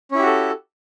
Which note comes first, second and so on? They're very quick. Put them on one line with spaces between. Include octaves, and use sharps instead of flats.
C#4 E4 G4 F#4 A4